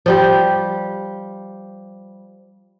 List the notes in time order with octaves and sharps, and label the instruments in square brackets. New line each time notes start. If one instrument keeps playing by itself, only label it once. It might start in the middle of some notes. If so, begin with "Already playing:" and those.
[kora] F3 G3 G4